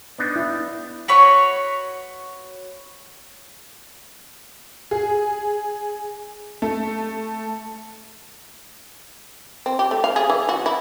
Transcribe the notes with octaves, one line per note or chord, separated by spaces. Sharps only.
B3 D4 D#4
E4
F#4 B4 C#5 C#6
G#4
A3
C4
G4
A3
F5
G#4
E3
F#4
E4